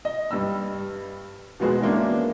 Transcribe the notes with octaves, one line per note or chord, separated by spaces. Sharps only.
D#5
G2 G3 E6
B2 F3 G#3 B3 F#4 G#4
E3 G#3 A#3 C#4 D4